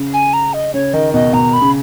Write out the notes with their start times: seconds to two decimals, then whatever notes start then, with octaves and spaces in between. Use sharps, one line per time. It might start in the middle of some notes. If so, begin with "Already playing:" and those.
Already playing: C#3
0.14 G#5
0.34 A#5
0.54 D#5
0.74 C#3 C#5
0.93 D#3 D#5
1.14 B2 D#5
1.33 B2 A#5
1.53 B5
1.61 C#3